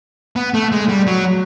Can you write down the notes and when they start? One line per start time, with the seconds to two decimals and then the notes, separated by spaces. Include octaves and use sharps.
0.36 B3
0.54 A3
0.72 G#3
0.89 G3
1.07 F#3